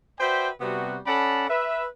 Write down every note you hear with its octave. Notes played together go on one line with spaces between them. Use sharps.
F#4 B4 C5 D5 E5 G5
C3 G3 B3 C4 F#4
C#4 A4 D5 F#5 A5 B5
B4 E5